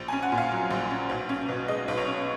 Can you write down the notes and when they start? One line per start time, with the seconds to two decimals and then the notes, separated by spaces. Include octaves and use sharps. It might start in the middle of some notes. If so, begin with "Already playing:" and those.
Already playing: A#1
0.08 C#4 G#5
0.23 F#5
0.32 A#2
0.38 F5
0.52 F#3
0.71 A#1
0.90 C#4
1.09 B1
1.29 C#4
1.49 B2
1.68 G#3 D#5
1.88 B1
1.97 C#5
2.07 C#4